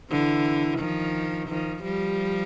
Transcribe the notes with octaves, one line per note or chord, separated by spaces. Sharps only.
D3 E3
D#3 F3
D#3 F3
F3 G3